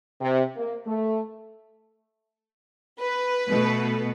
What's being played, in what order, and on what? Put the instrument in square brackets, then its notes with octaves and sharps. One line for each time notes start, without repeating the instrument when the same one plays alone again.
[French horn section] C3
A#3
A3
[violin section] B4
[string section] B2 A3